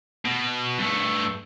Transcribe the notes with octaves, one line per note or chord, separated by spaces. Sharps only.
B2
G2 A3